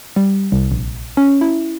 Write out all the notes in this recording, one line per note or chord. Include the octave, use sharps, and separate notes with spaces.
G3
C2
A#1
C#4
E4